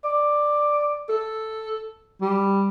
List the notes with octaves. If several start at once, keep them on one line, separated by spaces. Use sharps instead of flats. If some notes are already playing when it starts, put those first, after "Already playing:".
D5
A4
G3